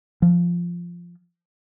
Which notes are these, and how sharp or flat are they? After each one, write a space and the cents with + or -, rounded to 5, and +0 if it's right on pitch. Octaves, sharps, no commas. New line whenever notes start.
F3 -5